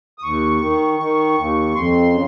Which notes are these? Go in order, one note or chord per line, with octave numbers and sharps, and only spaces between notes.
D#6
D#2 C#6
D#3
D#3 C#6
D#2
F2 C6
C#3